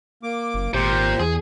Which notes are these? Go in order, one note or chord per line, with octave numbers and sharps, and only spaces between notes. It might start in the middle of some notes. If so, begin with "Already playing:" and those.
A#3 D6
F#1
G#1 A#2 G4 C5
E2 G#4